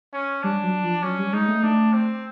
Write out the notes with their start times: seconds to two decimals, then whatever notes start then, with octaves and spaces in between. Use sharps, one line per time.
0.13 C#4
0.43 G3 D4
0.63 F#3
0.84 F3
1.03 F#3 C#4
1.19 G3
1.33 G#3 D#4
1.48 A3
1.63 A3 D4
1.93 C4